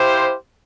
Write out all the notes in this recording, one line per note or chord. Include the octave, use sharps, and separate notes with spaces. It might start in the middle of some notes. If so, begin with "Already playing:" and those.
Already playing: E4 G4 C5 F5